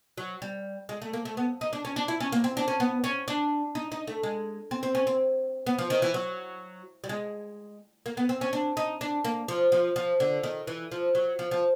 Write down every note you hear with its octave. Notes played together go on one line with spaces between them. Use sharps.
F#3
G3
G#3
A3
A#3
A3
B3
D#4
D4
C#4
D4
E4
C#4
A#3
C4
D4
C#4
B3
C#4
D4
D#4
D#4
A3
G#3
C4
C4
C#4
C4
B3
F3
D#3
E3
F#3
G3
G#3
A#3
B3
C4
C#4
D4
D#4
D4
A#3
F3
F3
F3
D3
D#3
E3
F3
F#3
F3
F3